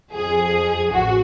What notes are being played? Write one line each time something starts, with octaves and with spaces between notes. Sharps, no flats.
F2 F3 G#4
A1 F#4